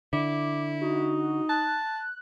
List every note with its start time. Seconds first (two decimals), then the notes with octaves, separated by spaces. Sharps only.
0.13 D3 E4 D6
0.81 D#4 F#4
1.49 A5 F#6